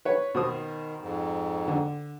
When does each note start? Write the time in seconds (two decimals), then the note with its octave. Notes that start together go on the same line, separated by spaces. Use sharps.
0.05 B4 C#5
0.35 B2 D#3 C5 D#6
1.00 F2 G#2
1.68 D3